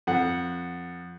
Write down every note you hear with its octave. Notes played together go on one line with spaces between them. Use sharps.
F2 F#5